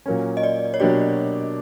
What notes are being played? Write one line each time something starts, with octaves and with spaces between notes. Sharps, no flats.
A#2 F#3 A#3 C#4
D#5
D5
C#5
B2 F#3 A#3 D4 G4 D5